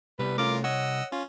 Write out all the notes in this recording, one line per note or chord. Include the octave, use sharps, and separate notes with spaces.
C2 G3 B3 B4
A3 C#4 F4 A#4 D6
C#5 D#5 F#5 E6
C#4 F4